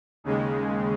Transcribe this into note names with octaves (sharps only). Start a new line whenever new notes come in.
D#2 C#3 G#3